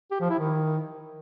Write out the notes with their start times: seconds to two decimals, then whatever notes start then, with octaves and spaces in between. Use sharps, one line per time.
0.11 G4
0.20 F3
0.30 E4
0.39 D#3